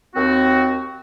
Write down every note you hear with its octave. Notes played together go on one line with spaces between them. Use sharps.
D#2 C4 F#4